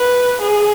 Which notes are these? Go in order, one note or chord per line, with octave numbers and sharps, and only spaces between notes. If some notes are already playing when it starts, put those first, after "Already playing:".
Already playing: B4
G#4